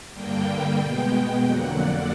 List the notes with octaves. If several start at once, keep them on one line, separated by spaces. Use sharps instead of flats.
G2 D3 G3 A#3 G5
B2 G#3 B3
F2 D3 F#3 A#3 F#5
D5